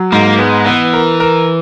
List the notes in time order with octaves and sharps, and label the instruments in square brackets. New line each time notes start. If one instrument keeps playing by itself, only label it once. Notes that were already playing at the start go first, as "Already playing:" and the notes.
Already playing: [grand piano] F#3
[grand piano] G#2 [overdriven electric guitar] A#3
[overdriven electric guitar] G#3 [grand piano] B3
[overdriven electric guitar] E3 [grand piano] B3
[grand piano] A#4
A#4